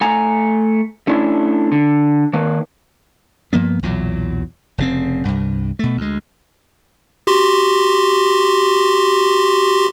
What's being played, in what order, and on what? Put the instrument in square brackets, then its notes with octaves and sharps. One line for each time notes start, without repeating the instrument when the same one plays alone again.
[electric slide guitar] A3 G#5 A#5
A3 C#4 D4 E4
D3
D#3 A#3 B4
[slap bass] G2 F3 A#3 B3
B1 E2 A#2 F#3
F1 C#3 C4
C2 G2
B2 A3
D2 G#3
[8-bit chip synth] F#4 G4 C6